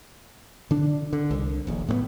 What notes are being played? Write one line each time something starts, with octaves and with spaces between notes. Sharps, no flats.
D3 D4
D3
C2
D#1 A#1
A2 G3 B3